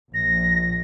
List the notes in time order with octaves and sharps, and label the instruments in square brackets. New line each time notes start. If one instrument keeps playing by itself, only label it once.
[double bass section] A#1 [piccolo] A#6